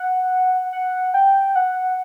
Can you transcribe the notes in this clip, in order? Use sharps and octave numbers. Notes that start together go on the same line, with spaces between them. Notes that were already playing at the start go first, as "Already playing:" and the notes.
Already playing: F#5
F#5
G5
F#5